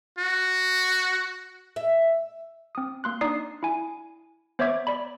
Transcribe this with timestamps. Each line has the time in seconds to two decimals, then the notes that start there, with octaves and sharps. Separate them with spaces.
0.19 F#4
1.76 E5
2.75 C4 D#6
3.04 A#3 C6 F#6
3.21 D4 D#4 D5 D#6 C7
3.63 E4 G#5
4.59 B3 C5 C#5 E5 D6 G#6
4.87 D5 B5